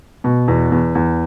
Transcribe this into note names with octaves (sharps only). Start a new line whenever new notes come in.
B2
E2
E2
E2